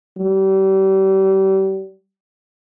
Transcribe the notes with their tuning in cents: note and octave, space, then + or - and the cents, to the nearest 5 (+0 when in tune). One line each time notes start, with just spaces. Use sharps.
G3 -35